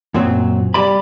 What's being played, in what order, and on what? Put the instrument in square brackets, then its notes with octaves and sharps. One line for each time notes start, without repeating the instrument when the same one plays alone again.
[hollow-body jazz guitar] F#2 A#2 F#3 C4
G3 D5 B5